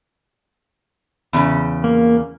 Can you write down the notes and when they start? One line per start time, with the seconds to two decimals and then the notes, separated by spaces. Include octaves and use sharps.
1.33 E2 A#2 C#3
1.84 A#3